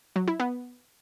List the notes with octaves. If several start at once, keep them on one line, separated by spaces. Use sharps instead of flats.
F#3
E4
B3